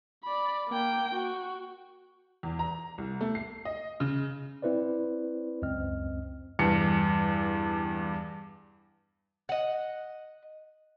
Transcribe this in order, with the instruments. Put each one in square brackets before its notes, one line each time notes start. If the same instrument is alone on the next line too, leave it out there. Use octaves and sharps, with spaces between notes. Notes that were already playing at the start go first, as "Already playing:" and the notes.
[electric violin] D5 B5
A#3 G5
F#4
[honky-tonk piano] E2
A#5
C2
A3
C7
D#5
C#3
[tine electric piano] C4 E4 B4 C5 D5
C#2 F#2 C4 D#5 F6
[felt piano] E2 G2 C#7
[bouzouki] D#5 F#5